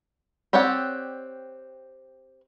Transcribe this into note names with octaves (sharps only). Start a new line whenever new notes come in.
C4 G4 C#5 D5 F#5